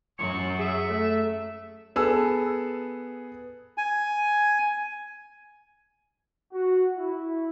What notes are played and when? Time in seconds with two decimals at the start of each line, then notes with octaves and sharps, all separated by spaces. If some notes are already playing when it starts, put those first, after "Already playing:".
0.19 F#2 F#3 C#6
0.59 G#4 E5
0.90 A3
1.96 B3 G#4 A4 E6
3.78 G#5
6.53 F#4
6.97 E4